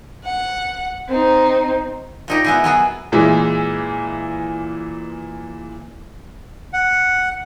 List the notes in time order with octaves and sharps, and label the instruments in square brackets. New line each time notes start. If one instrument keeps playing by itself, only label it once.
[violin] F#5
C4 D#4
[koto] A#2 D#4 G4
B3 E4 G#4
F#3 B3 G#4
[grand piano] A#2 E3 G#3 E4
[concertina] F#5